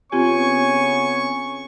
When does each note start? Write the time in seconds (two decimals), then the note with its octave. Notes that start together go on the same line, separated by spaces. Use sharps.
0.12 C#3 B3 C4 F4 G4 C#5 G#5 C#6